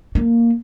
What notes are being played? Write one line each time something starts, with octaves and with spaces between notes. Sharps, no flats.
A#3